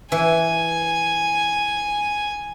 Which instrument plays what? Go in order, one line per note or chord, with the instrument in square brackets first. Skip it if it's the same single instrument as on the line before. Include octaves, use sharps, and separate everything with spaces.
[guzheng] E3 [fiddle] G#5